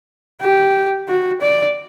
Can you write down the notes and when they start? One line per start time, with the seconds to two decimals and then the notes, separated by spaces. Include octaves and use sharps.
0.41 G4
1.08 F#4
1.41 D5